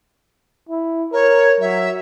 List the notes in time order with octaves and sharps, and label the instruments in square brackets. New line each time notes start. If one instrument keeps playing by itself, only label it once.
[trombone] E4
[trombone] A#4 [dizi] C#5
[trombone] F#3 [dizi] E5